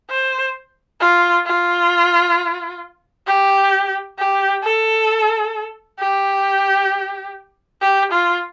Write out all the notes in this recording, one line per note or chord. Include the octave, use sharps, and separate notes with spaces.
C5
F4
F4
G4
G4
A4
G4
G4
F4